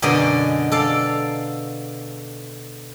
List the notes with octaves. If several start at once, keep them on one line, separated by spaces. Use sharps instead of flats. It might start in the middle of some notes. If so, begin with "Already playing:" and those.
F#2 B2 D3 G#4 D5 D#5
A4 D5 F5